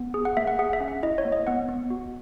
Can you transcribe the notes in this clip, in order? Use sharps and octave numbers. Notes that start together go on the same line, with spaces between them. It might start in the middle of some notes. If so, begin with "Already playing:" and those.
Already playing: B3
G#4
F#5
A#3 E5
F#5
G#4 F#5
E5
C#4
F#5
E4 D#5
C#5
A#3
D#5
B3 F#5
B3
F#4